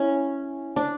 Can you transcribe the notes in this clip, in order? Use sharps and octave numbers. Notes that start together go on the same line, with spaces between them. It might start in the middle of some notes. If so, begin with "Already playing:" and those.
Already playing: C#4 E4
D4